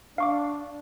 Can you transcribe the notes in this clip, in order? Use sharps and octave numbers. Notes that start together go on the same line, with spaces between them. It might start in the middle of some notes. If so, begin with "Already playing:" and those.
D4 F5 C#6 D6